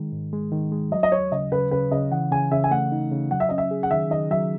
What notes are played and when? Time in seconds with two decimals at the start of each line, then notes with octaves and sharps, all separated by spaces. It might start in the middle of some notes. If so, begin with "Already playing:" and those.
Already playing: D#3 G#3
0.12 G#2
0.33 G#3
0.52 D#3
0.72 G#3
0.92 F#3 D#5
1.03 D#5
1.12 D#2 C#5
1.32 C#3 D#5
1.52 C#3 B4
1.71 C#3 B4
1.91 C#3 D#5
2.11 E3 F#5
2.31 C#3 G#5
2.52 C#3 E5
2.64 G#5
2.71 A3 F#5
2.92 D#4
3.12 C#3
3.31 F#3 F#5
3.40 E5
3.49 C#4 D#5
3.58 E5
3.71 G#4
3.83 F#5
3.91 D#3 E5
4.10 D#3 D#5
4.31 F#3 E5